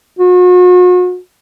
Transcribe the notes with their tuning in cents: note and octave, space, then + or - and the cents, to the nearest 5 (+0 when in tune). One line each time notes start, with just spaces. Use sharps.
F#4 -40